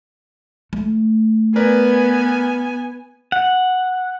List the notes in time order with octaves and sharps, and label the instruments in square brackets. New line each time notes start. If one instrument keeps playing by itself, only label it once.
[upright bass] A3
[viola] B3 G#5 [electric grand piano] A#4 B4 D5
[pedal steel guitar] F#5